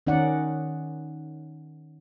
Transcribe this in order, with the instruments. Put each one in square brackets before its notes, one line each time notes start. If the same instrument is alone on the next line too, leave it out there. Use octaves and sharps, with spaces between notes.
[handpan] D#3 C#4 D#4 D5 F#5